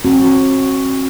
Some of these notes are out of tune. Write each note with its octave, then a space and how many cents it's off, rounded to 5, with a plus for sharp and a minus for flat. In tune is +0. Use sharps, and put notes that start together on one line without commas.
C4 +45 F#4 +0